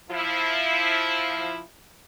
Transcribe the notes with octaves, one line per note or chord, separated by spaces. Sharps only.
F3 E4